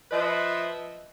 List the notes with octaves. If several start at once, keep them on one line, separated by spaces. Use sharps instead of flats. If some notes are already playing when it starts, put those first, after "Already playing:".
F3 B4 C5 D#5 E5